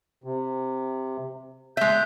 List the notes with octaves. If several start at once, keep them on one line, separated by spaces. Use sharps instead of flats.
C3
G#3 E5 G6